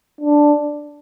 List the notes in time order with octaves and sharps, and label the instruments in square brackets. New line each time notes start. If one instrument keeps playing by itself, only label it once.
[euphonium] D4